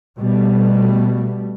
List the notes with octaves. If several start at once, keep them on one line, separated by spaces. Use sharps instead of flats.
B2 G3 A3